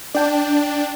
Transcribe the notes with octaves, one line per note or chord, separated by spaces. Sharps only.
D4 D5 G5